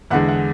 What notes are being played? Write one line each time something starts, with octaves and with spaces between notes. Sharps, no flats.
E2 D3 G#3 F#5
F#5